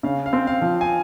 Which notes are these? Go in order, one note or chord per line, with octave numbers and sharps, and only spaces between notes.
C#3 F5
F5
C4
F5
F3
G#5